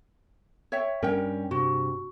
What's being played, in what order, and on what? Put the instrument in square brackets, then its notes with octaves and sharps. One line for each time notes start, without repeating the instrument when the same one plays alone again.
[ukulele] C#5 E5 G5
[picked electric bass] G2 G3 C#4 [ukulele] A#4 G5
[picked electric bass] G2 C3 [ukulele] F#4